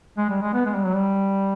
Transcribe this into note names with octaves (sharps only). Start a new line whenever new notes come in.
G#3
G3
G#3
B3
G#3
G3
F#3
G3